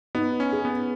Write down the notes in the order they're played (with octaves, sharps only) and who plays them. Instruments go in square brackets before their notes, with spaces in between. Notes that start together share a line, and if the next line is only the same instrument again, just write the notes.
[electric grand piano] B3 [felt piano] D#4
[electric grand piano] C#4
[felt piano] G#4
[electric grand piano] B3